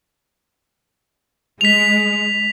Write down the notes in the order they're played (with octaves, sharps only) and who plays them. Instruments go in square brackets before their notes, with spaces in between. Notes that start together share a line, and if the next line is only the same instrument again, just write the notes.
[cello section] G#3 [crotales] B6 F7